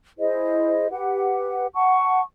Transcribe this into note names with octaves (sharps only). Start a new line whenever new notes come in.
E4 G#4 C5 D#5
G4 B4 F#5
F#5 A5 C#6